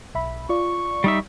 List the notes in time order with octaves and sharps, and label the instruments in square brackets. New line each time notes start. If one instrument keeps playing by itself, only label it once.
[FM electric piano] B1 E5 B5
[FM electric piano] F4 D5 [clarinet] C#6
[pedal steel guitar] G3 D#4 E5